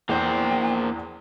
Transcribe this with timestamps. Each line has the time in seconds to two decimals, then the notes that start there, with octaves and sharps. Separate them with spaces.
0.09 E2 A#3 C5 G5